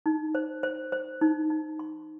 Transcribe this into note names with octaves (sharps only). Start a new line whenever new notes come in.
D#4
C5
C5
C5
D#4
D#4
C6